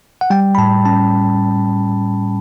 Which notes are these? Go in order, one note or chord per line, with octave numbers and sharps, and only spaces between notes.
F#5
G3 G5
B5
A2 A5
C#4 A5